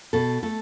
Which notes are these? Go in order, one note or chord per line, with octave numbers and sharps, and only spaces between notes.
B2 A4
A3 A4